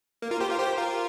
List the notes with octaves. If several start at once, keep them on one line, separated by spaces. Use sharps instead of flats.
A#3
F4 A#4
G4 C5
F4 A#4
G4 C5
F4 A#4